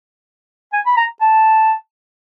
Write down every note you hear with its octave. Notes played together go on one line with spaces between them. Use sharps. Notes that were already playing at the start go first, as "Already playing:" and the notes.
G#5
B5
A#5
A5